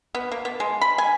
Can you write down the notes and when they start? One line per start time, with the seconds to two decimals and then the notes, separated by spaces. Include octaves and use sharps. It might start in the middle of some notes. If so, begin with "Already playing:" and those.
0.15 B3
0.32 A#3
0.45 B3
0.60 G#3
0.81 B5
0.98 G#5